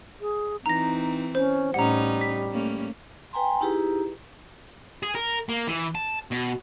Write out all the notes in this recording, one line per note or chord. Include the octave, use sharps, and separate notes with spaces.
G#4
E3 C4 D#4 A#5 A#6
C#4 C5
A2 G3 C#4 D#4 F#5 A#5
B6
A3 A#3 C#4
B4 G5 G#5 A#5 C6
D#4 E4 G4 G#4 B4 A#5
G#4
A#4
A#3
E3
A5
B2